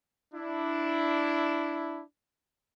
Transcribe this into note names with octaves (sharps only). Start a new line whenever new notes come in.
D4 E4